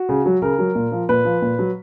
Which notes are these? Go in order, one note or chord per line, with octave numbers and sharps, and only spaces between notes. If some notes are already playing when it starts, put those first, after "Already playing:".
Already playing: F#4
C#3
F#3
C#3 A#4
F#3
A#2
F3
A#2 B4
F3
A#2
F#3